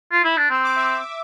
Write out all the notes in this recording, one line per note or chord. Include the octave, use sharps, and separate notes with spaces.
F4
E4
D4
C4 E6
D6
E5 E6